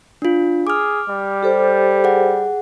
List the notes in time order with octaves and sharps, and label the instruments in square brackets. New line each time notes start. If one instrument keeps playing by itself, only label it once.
[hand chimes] D4 F4
[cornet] G#4 [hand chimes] D6 F6
[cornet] G3
[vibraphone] G4 A4 C5
[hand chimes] G#4 F#5